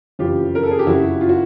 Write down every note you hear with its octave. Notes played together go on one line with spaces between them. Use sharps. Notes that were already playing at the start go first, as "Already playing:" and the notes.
F#1 F2 C#3 E3 F4 G4
A#4
A4
G#4
G4
F#1 F2 C#3 E4 F#4
F4
F#4